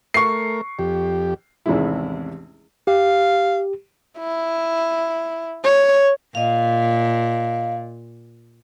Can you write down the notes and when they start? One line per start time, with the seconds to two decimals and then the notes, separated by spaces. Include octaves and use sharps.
0.14 A3 A#4 C#6 C7
0.79 F2 G4
1.66 A1 E2 C3 D#3 G#3 E4
2.87 G4 F5
4.19 E4
5.64 C#5
6.35 A#2 D#5 F5